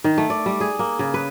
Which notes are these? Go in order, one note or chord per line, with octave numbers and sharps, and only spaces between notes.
D#3
A3
D5
G3
G#4
A#3
C#3
B4